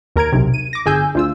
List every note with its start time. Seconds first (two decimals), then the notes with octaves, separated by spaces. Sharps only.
0.16 D#2 A#4 A#5 G#6 D7
0.32 B1 C3
0.54 D#7
0.73 D6 A#6
0.86 G1 G#4 G#5 E6 G6
1.15 D2 F4 E6